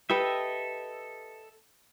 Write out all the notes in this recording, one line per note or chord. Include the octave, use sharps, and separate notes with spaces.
G4 A4 B4 D#5 E5